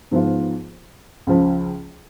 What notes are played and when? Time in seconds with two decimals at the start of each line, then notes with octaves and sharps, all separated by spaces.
0.11 G#2 F3 B3 F4
1.27 C#2 C#3 F3